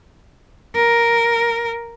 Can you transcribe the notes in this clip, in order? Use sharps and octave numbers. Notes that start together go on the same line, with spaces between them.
A#4